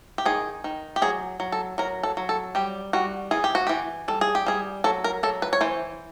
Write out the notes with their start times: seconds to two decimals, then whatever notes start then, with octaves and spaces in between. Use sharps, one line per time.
0.18 G4
0.25 D#3 G#4
0.64 D#3
0.96 G4
1.02 F#3 G#4
1.40 F#3
1.52 A4
1.78 F#3 A#4
2.03 A4
2.17 F#3
2.29 A4
2.55 G3 G4
2.93 G3 F#4
3.31 E3 G#4
3.44 G4
3.55 F#4
3.67 E3 G4
4.08 G3 A4
4.21 G#4
4.35 G4
4.46 G3 G#4
4.84 F#3 A4
5.04 A#4
5.23 F#3 A4
5.42 B4
5.53 C#5
5.61 E3 C5